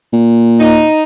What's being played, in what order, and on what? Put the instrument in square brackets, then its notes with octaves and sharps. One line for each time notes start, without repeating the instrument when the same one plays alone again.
[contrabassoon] A#2
[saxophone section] D#4